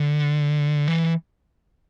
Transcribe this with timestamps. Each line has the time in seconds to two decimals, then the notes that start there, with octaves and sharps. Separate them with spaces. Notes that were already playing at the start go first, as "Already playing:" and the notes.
Already playing: D3
0.88 E3